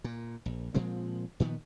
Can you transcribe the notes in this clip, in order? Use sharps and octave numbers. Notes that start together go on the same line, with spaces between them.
A#2
A#1
A#2 F3 G#3 C4
A#2 D#3 F3 B3